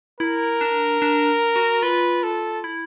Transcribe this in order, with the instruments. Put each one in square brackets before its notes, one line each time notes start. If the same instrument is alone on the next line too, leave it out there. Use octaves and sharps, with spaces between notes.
[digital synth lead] E4 [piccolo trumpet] A#4
[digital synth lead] D4
D4
F#4
[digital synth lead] F4 [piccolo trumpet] B4
[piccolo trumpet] A4
[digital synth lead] E4